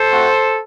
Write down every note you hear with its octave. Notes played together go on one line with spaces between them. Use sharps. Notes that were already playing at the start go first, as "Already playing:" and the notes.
Already playing: A4 C5
A3 C4 F#4